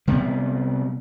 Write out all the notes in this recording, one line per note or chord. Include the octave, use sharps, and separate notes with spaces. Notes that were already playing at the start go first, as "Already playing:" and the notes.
C3 G3 B3